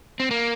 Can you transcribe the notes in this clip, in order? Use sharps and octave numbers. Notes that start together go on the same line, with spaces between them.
C4
A#3